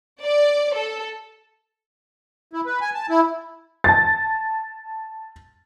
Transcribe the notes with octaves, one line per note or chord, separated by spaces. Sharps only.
D5
A4
E4
B4
G#5
A5
E4
A5 A6